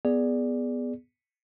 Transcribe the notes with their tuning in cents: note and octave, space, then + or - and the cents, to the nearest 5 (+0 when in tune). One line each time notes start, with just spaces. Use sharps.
B3 +0 G#4 +0 D5 +0